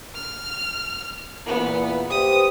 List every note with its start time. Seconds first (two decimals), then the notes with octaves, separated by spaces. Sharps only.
0.15 F6
1.46 E2 A#2 B3 E4
2.10 G4 B4 C5 D#6